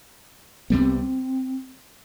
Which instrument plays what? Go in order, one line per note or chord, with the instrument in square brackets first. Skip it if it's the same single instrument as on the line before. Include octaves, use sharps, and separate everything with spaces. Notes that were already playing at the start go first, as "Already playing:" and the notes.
[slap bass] C2 C3 G3 B3 [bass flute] C4